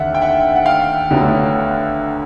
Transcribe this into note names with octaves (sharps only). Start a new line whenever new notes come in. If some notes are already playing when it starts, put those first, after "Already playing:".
Already playing: D#2 D3 E5 F#5
G5
E5 F#5
F#5
F5 G5
D2 D3 F#3 B3